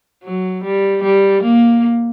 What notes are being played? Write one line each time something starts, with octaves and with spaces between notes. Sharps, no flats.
F#3
G3
G3
A#3